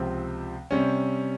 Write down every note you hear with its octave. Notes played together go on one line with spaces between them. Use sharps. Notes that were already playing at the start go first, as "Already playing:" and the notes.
Already playing: C#2 C3 F3 C4
C3 G3 C#4